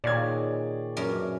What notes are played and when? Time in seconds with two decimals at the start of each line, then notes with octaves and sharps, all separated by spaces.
0.04 A#2 D#3 G#4 C#5 D5 G#6
0.97 F#2 E3 C#4 D4 A#4